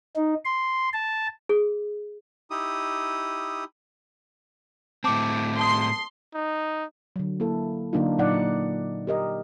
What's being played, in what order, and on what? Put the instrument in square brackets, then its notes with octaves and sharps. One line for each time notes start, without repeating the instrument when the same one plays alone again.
[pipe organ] D#4
C6
A5
[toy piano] G#4
[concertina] D#4 E4 G4 D#6
[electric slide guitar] A2 C4 [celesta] A5 D6
[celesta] A5 D#6 [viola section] C6
[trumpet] D#4
[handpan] D3 F#3
A#3 E4 A4
D3 F#3 A#3 D4 D#4 F4
A#2 F#3 D#4 D5 F#5
G4 A#4 D#5